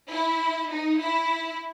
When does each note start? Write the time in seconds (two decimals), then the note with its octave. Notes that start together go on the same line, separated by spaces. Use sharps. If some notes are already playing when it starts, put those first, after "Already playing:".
0.11 E4
0.71 D#4
1.00 E4